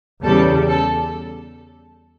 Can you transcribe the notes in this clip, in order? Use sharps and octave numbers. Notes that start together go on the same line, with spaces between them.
E2 C#3 G3 A4
A4